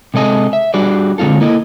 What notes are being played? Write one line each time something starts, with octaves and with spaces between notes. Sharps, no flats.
C3 G#3 A4 D#5 G#5
E5
G3 D4 F#4 G#4 D5
D3 G#3 C4 F4 A4
A#3 E4 A4 D#5